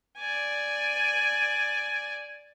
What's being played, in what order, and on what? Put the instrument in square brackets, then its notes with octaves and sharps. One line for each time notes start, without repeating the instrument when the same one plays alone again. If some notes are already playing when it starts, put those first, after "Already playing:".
[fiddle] D5 G#5